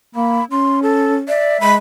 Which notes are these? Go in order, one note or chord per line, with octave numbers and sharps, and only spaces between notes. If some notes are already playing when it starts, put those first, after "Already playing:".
A#3 B5
C#4 C6
A4
D5 E5
G#3 B5